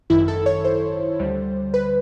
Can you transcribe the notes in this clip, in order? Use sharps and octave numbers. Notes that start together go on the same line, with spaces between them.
G#1 F#2 D#3 E4
A4
C#5
C5
D2 D3 G3
B4